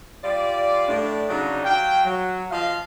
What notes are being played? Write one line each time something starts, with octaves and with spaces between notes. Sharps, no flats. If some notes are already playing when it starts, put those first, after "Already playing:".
G3 F4 D5
A2 D4
C#3 F#3 D4 D#4
F#3 F5 G5
F#3
F3 D#5 F5